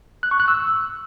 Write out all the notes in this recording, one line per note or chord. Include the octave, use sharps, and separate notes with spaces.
F#6
C#6
F#6
E6